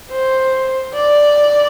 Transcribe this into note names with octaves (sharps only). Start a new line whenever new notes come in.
C5
D5